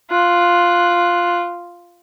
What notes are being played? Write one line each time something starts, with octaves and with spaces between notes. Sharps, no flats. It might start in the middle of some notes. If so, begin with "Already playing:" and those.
F4 F#6